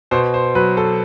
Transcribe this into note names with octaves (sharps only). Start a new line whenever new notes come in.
B2 C5
C5
F#3 B4
A4